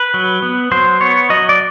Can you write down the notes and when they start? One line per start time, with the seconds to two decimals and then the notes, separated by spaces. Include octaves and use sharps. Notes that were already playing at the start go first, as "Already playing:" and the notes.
Already playing: B4
0.14 F#3
0.42 B3
0.71 F#3 C5
1.01 B3 C#5
1.30 F#3 D#5
1.49 D5